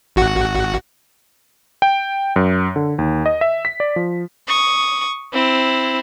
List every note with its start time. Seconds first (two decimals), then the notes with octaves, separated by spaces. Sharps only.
0.16 G#1 F#4 F#5
1.82 G5
2.36 F#2
2.76 D3
2.98 D#2
3.26 D#5
3.41 E5
3.65 B6
3.80 D5
3.96 F3
4.48 C#6 D#6
5.33 C4 E4